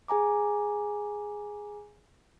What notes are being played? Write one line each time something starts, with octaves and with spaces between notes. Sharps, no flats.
G#4 G#5 A#5 D6